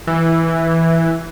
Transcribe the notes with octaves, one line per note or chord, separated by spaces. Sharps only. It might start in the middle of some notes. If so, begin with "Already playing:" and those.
E3